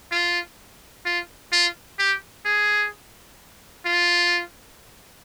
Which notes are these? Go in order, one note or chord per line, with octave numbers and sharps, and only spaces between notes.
F4
F4
F4
G4
G#4
F4